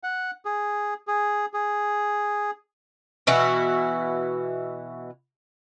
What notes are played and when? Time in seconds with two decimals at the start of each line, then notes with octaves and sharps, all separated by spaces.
0.03 F#5
0.45 G#4
1.07 G#4
1.54 G#4
3.27 B2 E3 E4 F#4